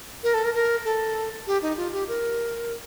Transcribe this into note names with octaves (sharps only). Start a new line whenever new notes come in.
A#4
A4
A#4
A#4
A4
G4
D#4
F4
G4
A#4